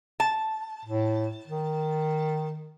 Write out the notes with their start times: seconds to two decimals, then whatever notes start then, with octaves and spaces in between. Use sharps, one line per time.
0.20 A5
0.85 A2
1.47 D#3